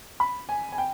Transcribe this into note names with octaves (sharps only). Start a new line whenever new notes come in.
B5
G#5
G#5
G5